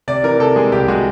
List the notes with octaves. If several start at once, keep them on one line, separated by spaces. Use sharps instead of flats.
C3 D5
E3 A#4
C3 A4
G#3 G#4
C2 G4
G#3 F#4